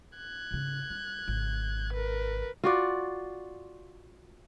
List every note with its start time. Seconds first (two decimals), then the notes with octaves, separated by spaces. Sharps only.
0.17 F#6 G#6
0.51 G#2 C#3
0.90 G3
1.28 G#1 C#3
1.93 A#4 B4
2.64 F4 F#4 D5